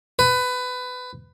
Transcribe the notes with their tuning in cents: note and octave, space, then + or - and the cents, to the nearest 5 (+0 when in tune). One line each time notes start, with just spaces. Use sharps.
B4 +20